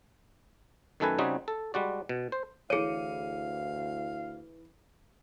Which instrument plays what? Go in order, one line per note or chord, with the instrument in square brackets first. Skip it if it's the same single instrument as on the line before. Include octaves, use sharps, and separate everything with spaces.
[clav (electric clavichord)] F#2 D#3 A3 A4 B4 G#5
C#3 G3 C4 D#4 F#4 G#4
A4
G3 G#3 F#4 D5
B2
C5
[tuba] D2 [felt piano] E3 C#7 D#7 [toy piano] G#4 C#5 [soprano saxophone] F5